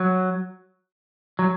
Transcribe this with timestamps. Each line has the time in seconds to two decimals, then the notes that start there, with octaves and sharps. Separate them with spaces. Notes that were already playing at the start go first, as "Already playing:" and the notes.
Already playing: F#3
1.39 F#3